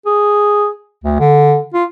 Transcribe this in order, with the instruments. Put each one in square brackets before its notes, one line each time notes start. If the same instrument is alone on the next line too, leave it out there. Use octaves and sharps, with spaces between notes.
[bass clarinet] G#4
D2
D3
F4